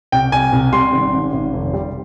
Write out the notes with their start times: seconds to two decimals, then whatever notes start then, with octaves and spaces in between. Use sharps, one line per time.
0.12 C2 G5
0.32 C2 G#5
0.53 C2
0.73 G3 C6
0.93 G#1
1.13 G#1
1.33 G#1
1.53 F1
1.74 G3